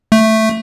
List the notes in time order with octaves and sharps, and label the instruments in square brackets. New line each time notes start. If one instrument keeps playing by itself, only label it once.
[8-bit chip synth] A3